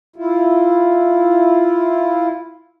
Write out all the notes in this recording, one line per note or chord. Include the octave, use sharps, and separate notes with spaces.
E4 F4